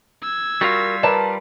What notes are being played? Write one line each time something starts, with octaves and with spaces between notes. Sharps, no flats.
E6 G#6
G3 F4 F#4 A#4
A#4 B4 D5 A5